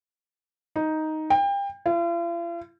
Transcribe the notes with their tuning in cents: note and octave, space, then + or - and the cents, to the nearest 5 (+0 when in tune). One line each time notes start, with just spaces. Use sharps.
D#4 +5
G5 +30
F4 -45